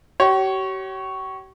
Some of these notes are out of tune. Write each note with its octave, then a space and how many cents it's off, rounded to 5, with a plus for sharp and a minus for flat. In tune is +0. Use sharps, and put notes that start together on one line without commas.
G4 -45 C#5 +0